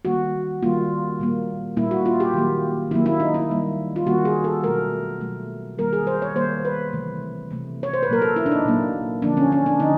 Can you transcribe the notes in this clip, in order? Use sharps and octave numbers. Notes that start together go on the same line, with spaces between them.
D#3 G3 A#3 F#4
D#3 G3 A#3 F4
A#2 G3 A#3
A#2 G3 A#3 E4
F#4
F4
G4
D#3 F#3 A#3
D#3 F#3 A#3 E4
E4
D#4
E4
D#3 G3 A#3
F4
D#3 G3 A#3 F#4
G#4
A4
B2 F#3 A3 A#4
B2 F#3 A3
D#3 G3 A#3 A#4
G#4
C5
C#5
D#3 G3 A#3 C5
B4
C3 E3 A3
C3 E3 A3
C#5
C5
B4
A#2 F#3 A#3 A#4
A4
E4
D4
D#4
A#2 F#3 A#3
D3 F3 A#3 D4
C#4
C#4
D4
D3 F3 D#4